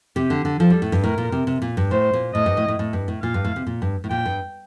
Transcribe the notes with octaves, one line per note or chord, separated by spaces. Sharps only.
C3 G4
D3
D3
F3 A4
G3
A2
G2
A2 A#4
A#2
C3
C3
A#2
G2
A2 C5
A#2
A2 D#5
G2
A2
A2
A2
G2
A2
A#2 F5
G2
A2
C3
A#2
G2
A2
A#2 G5
G2